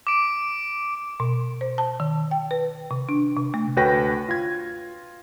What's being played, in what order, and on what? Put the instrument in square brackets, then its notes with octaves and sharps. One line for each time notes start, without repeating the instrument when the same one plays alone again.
[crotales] D6 D7
[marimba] B2
C5
A5
D#3
G5
B4
C3
D4
C3
A3
[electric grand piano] D2 F#4 B4 C#5 G5 A#6
F4 G#6